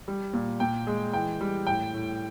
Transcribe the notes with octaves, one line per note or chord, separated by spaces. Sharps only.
G3
A#2
A#2 G5
G#3
E3 G5
G3
A2 G5
A2